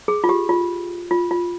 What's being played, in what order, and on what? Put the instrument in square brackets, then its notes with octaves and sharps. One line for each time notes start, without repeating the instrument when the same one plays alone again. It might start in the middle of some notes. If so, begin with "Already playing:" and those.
[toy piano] G#4
F4
G4
F4
F4
F4